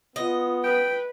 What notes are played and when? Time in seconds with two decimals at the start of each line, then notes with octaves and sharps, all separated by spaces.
0.16 B3 F4 D#5
0.64 B4 G5